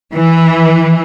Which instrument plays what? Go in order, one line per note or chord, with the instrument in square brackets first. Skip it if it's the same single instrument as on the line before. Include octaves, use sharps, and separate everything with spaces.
[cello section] E3